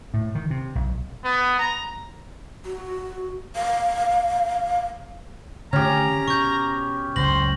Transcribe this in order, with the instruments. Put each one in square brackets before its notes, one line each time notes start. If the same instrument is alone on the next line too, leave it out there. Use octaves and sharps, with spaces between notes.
[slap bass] A2
D#3
C3
B1
[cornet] B3
A#5
[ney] F#4
F5
[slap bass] D3 D#3 A3 [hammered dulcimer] C#4 G4 [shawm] A#5
[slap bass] B2 [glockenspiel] C#6 G6
[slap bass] F#1 C#2 A2 [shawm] C5 [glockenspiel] A#6 F#7